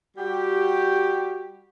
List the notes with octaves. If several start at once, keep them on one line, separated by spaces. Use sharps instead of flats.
G3 F#4 G4